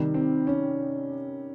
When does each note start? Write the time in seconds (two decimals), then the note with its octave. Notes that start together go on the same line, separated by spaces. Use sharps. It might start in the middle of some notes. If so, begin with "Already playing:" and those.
Already playing: C3 D#3 G3
0.14 C4
0.47 C#4